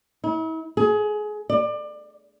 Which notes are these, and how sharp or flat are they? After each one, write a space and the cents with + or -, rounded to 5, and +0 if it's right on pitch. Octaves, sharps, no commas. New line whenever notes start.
E4 -40
G#4 +25
D5 +25